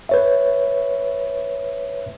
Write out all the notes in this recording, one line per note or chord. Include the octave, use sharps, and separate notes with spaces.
B4 C#5 E5